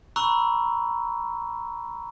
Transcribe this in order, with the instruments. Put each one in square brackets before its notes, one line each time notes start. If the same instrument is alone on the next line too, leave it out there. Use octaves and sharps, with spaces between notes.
[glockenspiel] A#5 B5 C#6 E6 F#6